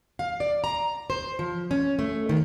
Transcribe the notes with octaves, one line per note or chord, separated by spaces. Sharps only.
F5
D5
A#5
C5
F3
C#4
A3
D#3